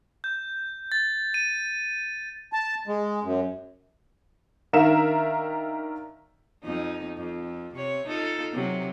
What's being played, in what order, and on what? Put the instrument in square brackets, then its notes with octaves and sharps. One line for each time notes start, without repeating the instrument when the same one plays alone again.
[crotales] G6
A6
D#7
[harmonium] A5
G#3
F#2
[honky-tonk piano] D#3 D4 A#4 E5 F5 E7
[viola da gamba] F2 D#4
F2
C3 C#5
D#4 F4 A4
C3 F#3